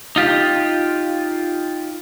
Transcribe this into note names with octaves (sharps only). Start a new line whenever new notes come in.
D#4 F4 G4